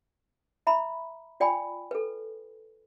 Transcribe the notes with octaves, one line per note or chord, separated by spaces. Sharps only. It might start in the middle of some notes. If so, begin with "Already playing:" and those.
E5 A#5 B5
F4 D5 G5 G#5 B5
A4 B4